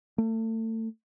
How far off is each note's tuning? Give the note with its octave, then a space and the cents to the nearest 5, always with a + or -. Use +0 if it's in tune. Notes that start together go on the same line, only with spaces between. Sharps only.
A3 +30